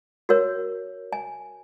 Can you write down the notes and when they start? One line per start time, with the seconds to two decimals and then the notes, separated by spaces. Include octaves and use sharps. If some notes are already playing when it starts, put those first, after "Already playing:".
0.29 F#4 A#4 C#5
1.13 G#5